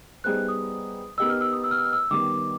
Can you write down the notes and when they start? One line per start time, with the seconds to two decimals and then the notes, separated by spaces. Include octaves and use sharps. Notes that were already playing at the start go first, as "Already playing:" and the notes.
0.24 G3 B3 D#4 G#4 C5 F#6
0.48 D#6
1.18 B3 D#4 G4 A#4 D#5 E6
1.30 F6
1.41 E6
1.53 D#6
1.64 E6
1.71 F6
1.78 E6
1.85 F6
1.93 E6
2.11 D#3 G3 B3 D6